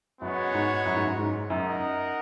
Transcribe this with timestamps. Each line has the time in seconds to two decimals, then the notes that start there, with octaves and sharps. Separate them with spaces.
0.21 F#2 G#3 B3 F#4 C#5
0.53 G#2
0.86 F#2
0.95 G#2
1.05 F#2
1.18 G#2
1.50 F#2 D#4 A#4 D#5 F#5